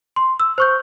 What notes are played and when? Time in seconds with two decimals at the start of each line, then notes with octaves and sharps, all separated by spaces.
0.16 C6
0.40 E6
0.58 C5 C#6 G6